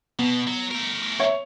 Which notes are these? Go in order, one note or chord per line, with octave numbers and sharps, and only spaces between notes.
B2 B3
F#3
A3 A#4
C#5 E5